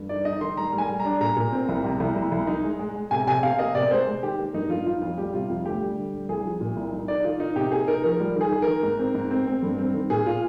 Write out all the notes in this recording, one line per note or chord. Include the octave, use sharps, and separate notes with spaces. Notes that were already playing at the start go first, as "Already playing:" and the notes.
Already playing: G2
D#4 D5
D#4 D#5
D#3 C6
G3 A#5
G3
G#5
G3
D4 A#5
A#2 A#5
A#2
C4
C2
C3
C2
C2
C2
D#4
G#3
G#3
G#3
C3 G#5
C3 G#5
C3 F5
A#3 D#5
C3 D5
G#3 C5
G#3
D#3 G4
A#3
G2 D#4
G2 F4
D#4 F4
F2 F4
G3 G4
C3 F4
F2 F4
D2 G4
G3
D3
G3
C2 G#4
F3
A#2
C2
D#4
D#4 D5
D#3 F4
D#4
C3 G4
A#3 G#4
D#4 A#4
F3 A#4
G3
D#3 G#4
D#3
D#3 A#4
G#2
C4
G#2
C4
C4
G2
C4
D#3
A#2 G#4
A#2 F4